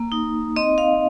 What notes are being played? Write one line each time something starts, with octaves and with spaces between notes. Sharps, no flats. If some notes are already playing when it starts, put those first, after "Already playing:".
Already playing: A#3
D#4
C4 D#5
F5